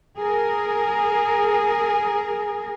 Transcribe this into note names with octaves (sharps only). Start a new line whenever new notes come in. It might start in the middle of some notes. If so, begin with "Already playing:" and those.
G#4 A#4